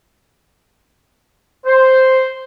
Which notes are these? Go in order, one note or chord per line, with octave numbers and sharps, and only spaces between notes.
C5